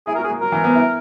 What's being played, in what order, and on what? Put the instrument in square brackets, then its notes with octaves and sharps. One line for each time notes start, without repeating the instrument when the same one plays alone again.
[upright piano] E4 [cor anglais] G#4
[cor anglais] A#4
[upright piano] F#4
[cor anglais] G#4
[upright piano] A#3
[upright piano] F#3 [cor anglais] A#4
[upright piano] E3
B3
E4